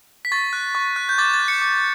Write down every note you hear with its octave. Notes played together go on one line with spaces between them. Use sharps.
B6
C#6 A6
F#6
C#6
F#6
G6
D6 A6
A6
F#6
C#7
D6